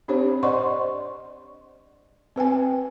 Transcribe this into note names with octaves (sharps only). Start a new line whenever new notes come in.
C4 D4 G4 C5 C#5
C5 D5 D#5 F#5 C6 C#6
C4 B4 G5 G#5